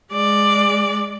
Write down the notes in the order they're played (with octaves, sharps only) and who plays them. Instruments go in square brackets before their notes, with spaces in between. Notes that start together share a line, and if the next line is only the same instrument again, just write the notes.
[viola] G#3 D5